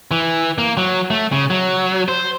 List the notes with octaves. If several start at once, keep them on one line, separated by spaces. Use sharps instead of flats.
E3
A#3
F#3
A3
C#3
F#3
C5